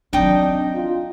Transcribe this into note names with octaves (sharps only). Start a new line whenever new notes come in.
F#3 C4 D4 D#4 G5 D#6
F4